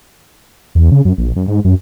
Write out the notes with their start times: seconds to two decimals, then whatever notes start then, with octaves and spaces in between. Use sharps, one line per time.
0.75 E2
0.92 C#3
1.05 F#2
1.18 A#1
1.36 F#2
1.48 G#2
1.65 F#2